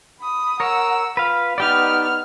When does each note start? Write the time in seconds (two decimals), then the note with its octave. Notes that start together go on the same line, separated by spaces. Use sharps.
0.20 B5 D#6
0.60 A#4 C#5 F#5 E6
1.17 F4 B4 F5
1.58 B3 D#4 G4 D5 F6